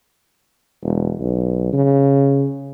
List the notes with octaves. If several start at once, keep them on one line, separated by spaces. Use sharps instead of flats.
E1
B1
C#3